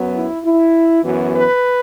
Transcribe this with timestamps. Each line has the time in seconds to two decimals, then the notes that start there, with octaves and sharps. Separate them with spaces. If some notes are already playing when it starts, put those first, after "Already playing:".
Already playing: F#2 F#3 B3
0.14 E4
0.44 E4
1.04 F#2 E3 B3 F#4
1.34 B4